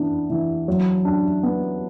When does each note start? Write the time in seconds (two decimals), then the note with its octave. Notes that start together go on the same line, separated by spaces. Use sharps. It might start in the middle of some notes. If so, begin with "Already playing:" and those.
Already playing: E3 B3 D4
0.30 E3
0.68 F#3
1.05 D4
1.43 B3